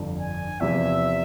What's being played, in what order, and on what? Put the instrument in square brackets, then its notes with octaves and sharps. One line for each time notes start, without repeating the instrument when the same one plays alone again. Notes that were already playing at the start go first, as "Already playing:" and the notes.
Already playing: [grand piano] G1 F2 D3
[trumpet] G#5
[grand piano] E2 C3 F3 [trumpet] E5